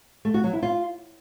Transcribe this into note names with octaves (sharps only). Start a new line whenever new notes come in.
A3
F#4
F#3
E4
F4